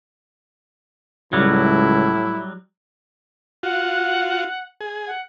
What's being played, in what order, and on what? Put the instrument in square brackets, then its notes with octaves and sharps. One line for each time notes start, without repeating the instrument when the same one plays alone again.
[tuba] C#2 [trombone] A2 [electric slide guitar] F#3 G3 [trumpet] E4
[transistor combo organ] F4 F#4 [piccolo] F#5
[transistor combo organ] G#4
[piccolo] F#5